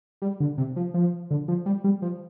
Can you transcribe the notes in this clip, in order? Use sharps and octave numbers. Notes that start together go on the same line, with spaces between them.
G3
D3
C3
F3
F3
D3
F3
G3
G3
F3